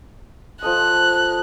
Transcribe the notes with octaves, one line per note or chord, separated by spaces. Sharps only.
F3 A4 D#5 F#6